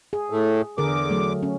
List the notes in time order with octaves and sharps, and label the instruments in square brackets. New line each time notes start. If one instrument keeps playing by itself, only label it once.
[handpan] G#4
[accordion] A2 A3
[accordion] E2 D6 [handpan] D3 G#4 A#4
[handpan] F#3 A3
C#4